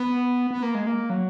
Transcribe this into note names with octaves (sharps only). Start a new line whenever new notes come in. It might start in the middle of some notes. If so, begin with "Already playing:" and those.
Already playing: B3
B3
A#3
G#3
A#3
F#3